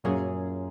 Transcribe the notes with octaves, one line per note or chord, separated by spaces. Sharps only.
F#2 A#2 F#3 A#3 C#4 G#4